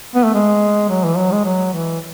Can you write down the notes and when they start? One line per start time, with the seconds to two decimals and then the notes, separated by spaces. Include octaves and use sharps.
0.15 B3
0.24 A3
0.34 G#3
0.89 F#3
1.04 E3
1.17 F#3
1.32 G#3
1.45 F#3
1.73 E3